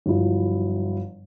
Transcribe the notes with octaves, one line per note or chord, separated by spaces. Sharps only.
G1 F3 F#3 E4